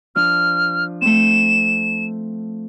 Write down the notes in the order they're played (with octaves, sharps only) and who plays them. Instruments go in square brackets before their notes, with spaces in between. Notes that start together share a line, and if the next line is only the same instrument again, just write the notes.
[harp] F3 D4 [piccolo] F6
[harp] A3 C4 [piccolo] E7